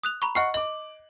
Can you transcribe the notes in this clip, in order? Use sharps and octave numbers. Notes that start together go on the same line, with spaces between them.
D#6 F#6 F7
A#5 B5 C#6
D#5 F#5 C#6 F6 C7
D#5 D6 F#7